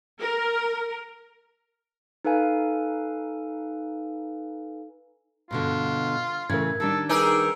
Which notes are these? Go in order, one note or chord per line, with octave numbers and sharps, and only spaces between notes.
A#4
D#4 A4 B4 F5 G#5
G2 B2 D3 F4
A2 C#3 E3 A#4 G#6
D#3 G3 D4 A4
D#4 G4 G#4 A#4 B4 E6